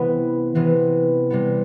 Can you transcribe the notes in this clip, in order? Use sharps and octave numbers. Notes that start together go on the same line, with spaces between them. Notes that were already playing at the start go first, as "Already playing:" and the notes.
Already playing: C3 E3 B3
C3 E3 B3
C3 G3 B3